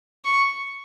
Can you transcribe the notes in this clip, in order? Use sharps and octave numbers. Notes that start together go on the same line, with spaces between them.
C#6